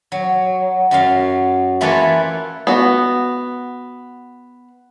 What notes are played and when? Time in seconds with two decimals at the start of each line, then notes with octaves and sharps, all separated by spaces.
0.12 F#3
0.91 F#2 F#3 F5
1.81 E3 A#3 F4 A4 B4 C#5
2.67 B3 F#4